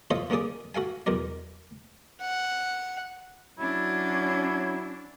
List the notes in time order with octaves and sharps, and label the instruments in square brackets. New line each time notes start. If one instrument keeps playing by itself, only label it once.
[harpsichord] F4 A4 C5 C#5 D#5 F5
D3 A#3 C#4 G#4 D5
F#4 A4 F5 G#5
B1 E2 A#4 D5
[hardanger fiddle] F#5
[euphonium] F#3 [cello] C#4 D4 [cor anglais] E4 [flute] G#6